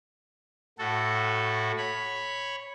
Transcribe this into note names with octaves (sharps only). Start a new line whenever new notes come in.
A2 F#4 A4
C#5 B5